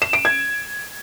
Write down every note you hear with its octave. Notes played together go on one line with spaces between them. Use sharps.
E7
D7
G#6